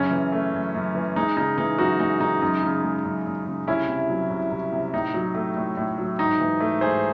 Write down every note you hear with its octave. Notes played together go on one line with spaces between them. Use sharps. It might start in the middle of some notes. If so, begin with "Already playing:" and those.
Already playing: F#2 C#3 C#4
E3
A3
F#2
F#2
E3
G#3 D#4
C#3 D#4
E3 D#4
F#2 D#4 F#4
G#3 D#4
C#3 D#4
F#2 D#4
C#3
G#3
F#2
F#2
C#3
C2 C#4 E4
C3
F#3
C2
C2
C3
A2 D#4
F#3
A3
A2
A2
F#3
G#2 D#4
E3
A3
G#2 G#4 C5